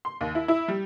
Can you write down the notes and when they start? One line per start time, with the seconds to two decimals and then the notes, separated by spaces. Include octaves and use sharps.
0.05 C6
0.21 D#2
0.35 E4
0.48 E4
0.68 G3